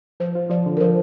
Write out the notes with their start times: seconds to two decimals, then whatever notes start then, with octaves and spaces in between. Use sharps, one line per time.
0.20 F3 C5
0.35 F4
0.50 F3 D5
0.66 D3
0.77 A#4
0.80 F3 C5